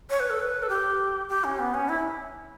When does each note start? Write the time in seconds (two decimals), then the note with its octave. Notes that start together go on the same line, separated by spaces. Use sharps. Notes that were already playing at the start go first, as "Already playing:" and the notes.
0.10 C#5
0.20 B4
0.30 A4
0.39 B4
0.62 A4
0.69 G4
1.29 G4
1.44 C#4
1.59 B3
1.74 C#4
1.89 E4